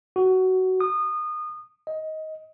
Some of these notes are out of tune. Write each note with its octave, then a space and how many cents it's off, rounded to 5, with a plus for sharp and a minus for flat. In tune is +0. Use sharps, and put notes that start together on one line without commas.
F#4 +15
D#6 -25
D#5 +15